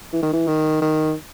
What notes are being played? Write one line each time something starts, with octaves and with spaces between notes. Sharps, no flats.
E3
D#3
E3
D#3
D#3